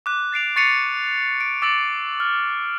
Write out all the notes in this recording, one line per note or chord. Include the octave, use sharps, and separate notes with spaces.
D6 F#6
A6 C7 D7 F7
C#6 A6 C7 C#7 D#7 F7
D7
D6 E6 A6 C#7 D7 F#7
F6